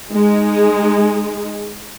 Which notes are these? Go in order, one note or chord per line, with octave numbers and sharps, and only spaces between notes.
G#3 D#4 G#4